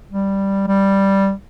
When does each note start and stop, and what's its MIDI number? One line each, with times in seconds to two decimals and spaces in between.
0.11 0.63 55
0.67 1.32 55